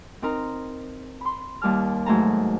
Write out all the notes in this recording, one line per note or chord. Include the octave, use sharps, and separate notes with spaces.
C4 D#4 A#4 A#5
B5 C6
D#2 G3 A5 F6
G#2 F#3 A3 C5 A5 A#5